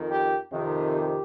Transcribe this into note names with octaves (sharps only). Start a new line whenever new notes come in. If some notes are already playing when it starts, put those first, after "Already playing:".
Already playing: F2 D#3
G4
F2 C3 D#3
G4